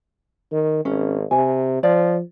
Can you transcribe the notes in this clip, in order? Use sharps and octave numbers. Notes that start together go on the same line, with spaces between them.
D#3
G#1 C#4
C3 G#5
F3 D5